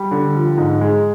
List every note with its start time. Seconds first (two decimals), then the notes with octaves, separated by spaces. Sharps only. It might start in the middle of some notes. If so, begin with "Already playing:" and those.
Already playing: G3
0.11 D3
0.35 F3
0.58 G#2
0.81 G#3